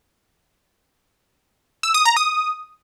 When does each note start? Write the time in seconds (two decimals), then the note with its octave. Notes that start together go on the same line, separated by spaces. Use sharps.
1.83 E6
1.94 D#6
2.05 A#5
2.17 D#6